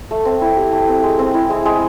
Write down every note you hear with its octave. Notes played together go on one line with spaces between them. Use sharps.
A3
C4
E4
G4
A3
C4
G#3
C4
E4
G#3
G#3